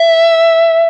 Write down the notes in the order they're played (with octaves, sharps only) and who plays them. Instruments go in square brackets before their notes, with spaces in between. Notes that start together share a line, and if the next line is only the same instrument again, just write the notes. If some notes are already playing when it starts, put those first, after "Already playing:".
Already playing: [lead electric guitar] E5